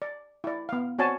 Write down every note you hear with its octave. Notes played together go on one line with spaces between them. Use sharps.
D5
E4 D5
B3 F5
C4 F#4 C#5 D5 G#5 A5